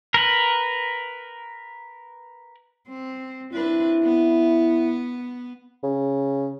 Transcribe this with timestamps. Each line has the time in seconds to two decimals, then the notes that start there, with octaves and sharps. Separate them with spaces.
0.14 A#4 B4
2.89 C4
3.53 C4 D4 E4 B4
4.04 B3
5.83 C#3